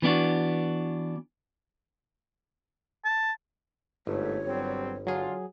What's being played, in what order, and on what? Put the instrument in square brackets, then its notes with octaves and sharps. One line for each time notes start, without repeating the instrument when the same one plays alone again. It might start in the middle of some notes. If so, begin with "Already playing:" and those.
[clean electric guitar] E3 B3 D4 F#4
[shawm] A5
[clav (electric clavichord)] G1 [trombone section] G#2 A3 [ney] C#5
[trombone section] F#3 G3 C4
[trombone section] D3 F4 [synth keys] F#3 G#4